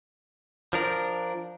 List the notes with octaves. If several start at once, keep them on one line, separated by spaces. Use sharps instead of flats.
F3 D4 A#4